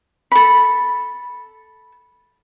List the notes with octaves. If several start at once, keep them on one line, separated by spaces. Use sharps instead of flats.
A4 B5